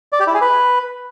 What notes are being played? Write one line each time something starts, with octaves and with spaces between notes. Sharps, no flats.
D5
G4
E4
G#4
B4